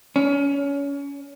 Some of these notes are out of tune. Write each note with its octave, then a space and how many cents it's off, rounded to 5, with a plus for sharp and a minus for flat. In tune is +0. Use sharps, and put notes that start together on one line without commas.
C#4 +25